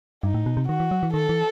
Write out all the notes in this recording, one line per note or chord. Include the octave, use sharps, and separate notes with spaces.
G2 D#4
A2
B2
C3
D#3 F#4
E3
F#3
E3
D#3 A4
E3